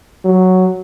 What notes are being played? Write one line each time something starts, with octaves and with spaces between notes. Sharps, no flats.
F#3